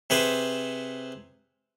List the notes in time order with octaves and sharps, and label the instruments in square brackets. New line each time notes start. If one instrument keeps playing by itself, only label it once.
[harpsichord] C3 G#4 B4 C5